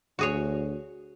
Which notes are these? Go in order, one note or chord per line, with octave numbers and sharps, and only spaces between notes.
D2 F#4 G#4 C#5